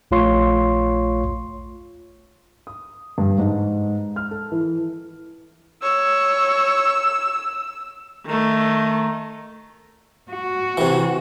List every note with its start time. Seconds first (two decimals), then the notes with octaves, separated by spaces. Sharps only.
0.11 A#1 A3 F4 C#5 C6 C#6
2.67 D#6
3.18 G2
3.38 G#2
4.16 F6
4.31 A4
4.52 E3
5.82 C#5 E6
8.26 D#3 A3
10.32 F#4
10.78 C3 E3